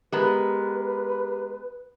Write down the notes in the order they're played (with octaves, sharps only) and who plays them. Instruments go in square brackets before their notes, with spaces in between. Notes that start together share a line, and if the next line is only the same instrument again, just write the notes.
[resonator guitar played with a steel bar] G#3 B3 [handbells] G4 A#4 A#5 [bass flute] B4